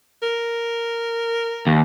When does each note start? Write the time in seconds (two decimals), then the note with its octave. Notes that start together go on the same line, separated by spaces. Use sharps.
0.22 A#4
1.67 D#2